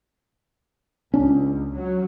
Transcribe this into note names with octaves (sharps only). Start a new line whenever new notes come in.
C#2 C#4 D4
F#3